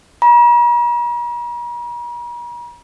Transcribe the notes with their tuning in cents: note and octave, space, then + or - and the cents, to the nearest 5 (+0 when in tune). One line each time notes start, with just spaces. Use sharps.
A#5 +45